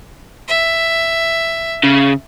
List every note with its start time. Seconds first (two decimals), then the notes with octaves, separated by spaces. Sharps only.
0.48 E5
1.84 C#3